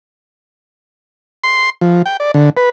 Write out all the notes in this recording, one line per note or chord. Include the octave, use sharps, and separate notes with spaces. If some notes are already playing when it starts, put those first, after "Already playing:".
C6
F3
G5
D5
D3
B4